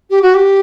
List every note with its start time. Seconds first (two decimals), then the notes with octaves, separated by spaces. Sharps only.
0.10 G4
0.22 F#4
0.34 G4